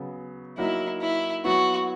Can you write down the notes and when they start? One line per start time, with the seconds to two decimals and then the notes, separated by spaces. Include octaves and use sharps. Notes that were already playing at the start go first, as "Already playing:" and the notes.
Already playing: C#3 F#3 B3
0.58 F#3 A#3 D#4 E4 F#4
1.01 E4
1.45 F#3 B3 E4 F#4